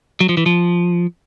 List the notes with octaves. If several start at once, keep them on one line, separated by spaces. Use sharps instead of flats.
F#3
F3
E3
F3